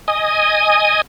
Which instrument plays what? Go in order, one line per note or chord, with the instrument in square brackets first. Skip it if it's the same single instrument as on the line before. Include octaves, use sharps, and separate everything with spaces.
[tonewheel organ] D#5 G#5 D#6